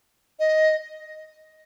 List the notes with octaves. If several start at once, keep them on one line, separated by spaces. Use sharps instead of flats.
D#5